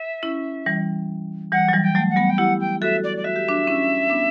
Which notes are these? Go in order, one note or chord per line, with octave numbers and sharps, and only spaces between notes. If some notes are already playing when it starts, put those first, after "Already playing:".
Already playing: E5
C#4 E4
E3 G3
E3 G3 F#5
F#3
E3 G3
G5
F#3 A3
F#5
G3 B3
G5
E4 G4 F#5
G5
F#4 A4 E5
D5
D5
F#4 E5
G4
D4 F#4
C#4 E4
B3 D4